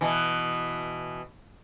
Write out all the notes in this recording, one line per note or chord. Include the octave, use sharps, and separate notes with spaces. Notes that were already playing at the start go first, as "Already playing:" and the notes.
B2 E3